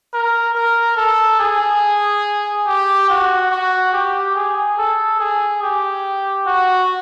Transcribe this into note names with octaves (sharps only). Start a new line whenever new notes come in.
A#4
A#4
A4
G#4
G4
F#4
F#4
G4
G#4
A4
G#4
G4
F#4